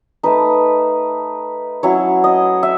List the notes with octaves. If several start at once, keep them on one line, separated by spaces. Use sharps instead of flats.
A3 D#4 B4
F#3 C#4 E4 C#5
D#5
E5